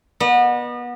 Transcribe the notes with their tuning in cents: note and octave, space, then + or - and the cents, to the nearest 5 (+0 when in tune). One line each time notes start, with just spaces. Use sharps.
B3 -25 D#5 -35